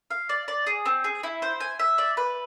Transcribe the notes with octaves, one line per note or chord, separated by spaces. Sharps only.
F5
D5
D5
G#4
C4
G#4
E4
C5
G#5
E5
D5
B4